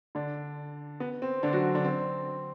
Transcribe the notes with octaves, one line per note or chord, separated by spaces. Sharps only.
D3 D4
B3
C4
D3 D4
F#3 F#4
D3 D4
C4